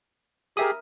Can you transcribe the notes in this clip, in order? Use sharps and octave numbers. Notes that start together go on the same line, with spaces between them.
G4 G#4 A#4 E5 D#6